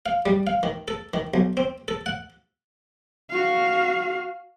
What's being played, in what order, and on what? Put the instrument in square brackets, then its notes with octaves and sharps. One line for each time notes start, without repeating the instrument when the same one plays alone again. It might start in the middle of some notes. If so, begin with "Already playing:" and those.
[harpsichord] F5
G3
F5
D#3
A4
D#3
B1
C4
A4
F#5
[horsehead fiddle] F#4 F5